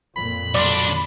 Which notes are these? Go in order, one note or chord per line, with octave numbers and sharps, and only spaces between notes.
F2 A#2 B5
B1 D4 D5 C6